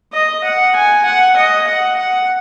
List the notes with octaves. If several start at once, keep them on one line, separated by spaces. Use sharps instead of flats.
D#5
F#5
G#5
F#5
D#5
F#5
F#5